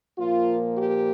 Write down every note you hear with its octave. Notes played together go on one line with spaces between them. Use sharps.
A#2 F3 A#3 F4
G4